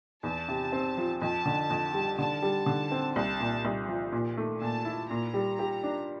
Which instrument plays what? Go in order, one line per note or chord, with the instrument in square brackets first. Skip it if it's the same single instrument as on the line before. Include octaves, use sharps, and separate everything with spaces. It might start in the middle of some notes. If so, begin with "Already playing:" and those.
[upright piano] E2 [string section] A5
[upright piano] C3
C4
F3
[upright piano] F2 [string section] A5
[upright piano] D3
F2
G3
[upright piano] D3 [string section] A5
[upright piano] G3
D3
C4
[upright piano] C2 [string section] A5
[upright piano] A#2
C2
F3
A#2
A3
[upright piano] A#2 [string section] A5
[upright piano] E4
[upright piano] A#2 [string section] A#5
[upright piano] G3
G4
D4